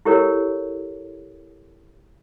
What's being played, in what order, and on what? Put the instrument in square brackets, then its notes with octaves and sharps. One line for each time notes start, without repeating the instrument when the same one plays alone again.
[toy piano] E4 G4 A4 A#4 C#5